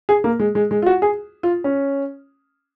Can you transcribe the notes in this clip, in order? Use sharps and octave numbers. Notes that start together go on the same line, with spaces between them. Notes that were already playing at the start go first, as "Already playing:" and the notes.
G#4
A#3
G#3
G#3
G#3
F4
F#4
G#4
F4
C#4